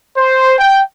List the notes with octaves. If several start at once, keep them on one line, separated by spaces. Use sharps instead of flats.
C5
G5